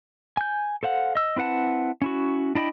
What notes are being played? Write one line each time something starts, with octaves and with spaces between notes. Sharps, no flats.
G#5 G6
A4 C5 F5 F#5
D#5 E6
C4 E4 B4 F#5 A5
C#4 E4 F#4
D4 E4 D#5 G5 B5